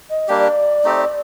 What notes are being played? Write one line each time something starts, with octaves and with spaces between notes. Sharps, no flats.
D#5
G3 A#3 D4 G4 D5
A3 C4 D#4 G4